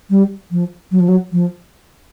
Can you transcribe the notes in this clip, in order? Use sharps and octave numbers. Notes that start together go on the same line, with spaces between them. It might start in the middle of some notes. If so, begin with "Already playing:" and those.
G3
F3
F#3
F3
F#3
F3